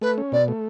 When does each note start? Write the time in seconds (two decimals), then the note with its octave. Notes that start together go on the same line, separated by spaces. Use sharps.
0.02 A3 B4
0.18 C#4
0.32 B2 D5
0.48 A3